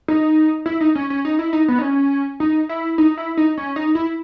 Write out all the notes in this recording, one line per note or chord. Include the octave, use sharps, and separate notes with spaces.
D#4
E4
D#4
C#4
C#4
D#4
E4
D#4
B3
D#4
C#4
D#4
E4
D#4
E4
D#4
C#4
D#4
E4